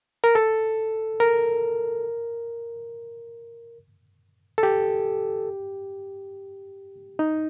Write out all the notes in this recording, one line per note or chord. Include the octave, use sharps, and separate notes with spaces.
A#4
A4
A#4
A4
G4
D#4